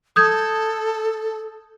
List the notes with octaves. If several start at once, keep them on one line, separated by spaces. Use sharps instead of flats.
A4 D#6 G6 G#6